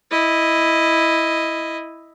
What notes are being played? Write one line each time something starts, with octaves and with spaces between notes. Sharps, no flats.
E4 D#5